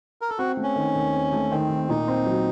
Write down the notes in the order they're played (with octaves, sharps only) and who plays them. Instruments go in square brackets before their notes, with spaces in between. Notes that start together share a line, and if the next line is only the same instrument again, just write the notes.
[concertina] A#4
A4
[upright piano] C4 [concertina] F#4
[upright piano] A3
[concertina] C#4
[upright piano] D#3
D#2
C4
A3
[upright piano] D#3 [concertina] C4
[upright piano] D#2
[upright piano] A#2 [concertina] D#4
[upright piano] C4
F#3